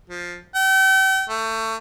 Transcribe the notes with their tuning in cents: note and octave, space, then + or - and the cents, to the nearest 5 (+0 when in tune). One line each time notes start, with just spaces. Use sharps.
F3 +10
G5 -40
A3 +25